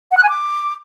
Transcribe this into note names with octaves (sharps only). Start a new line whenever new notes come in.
F#5
F#6
G#5
D6